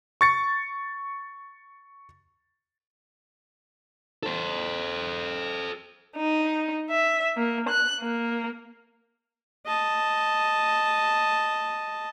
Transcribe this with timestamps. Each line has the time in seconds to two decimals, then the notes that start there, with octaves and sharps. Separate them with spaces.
0.21 C#6 A6 C#7
4.23 A4 C5
6.15 D#4
6.89 E5
7.36 A#3
7.68 F#6
8.00 A#3
9.67 D#5 A5